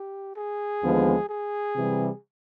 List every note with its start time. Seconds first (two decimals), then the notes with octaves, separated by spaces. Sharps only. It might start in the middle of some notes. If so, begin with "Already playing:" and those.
Already playing: G4
0.36 G#4
0.82 D#2 D3 F3 G#3 B3
1.29 G#4
1.76 C3 E3 G3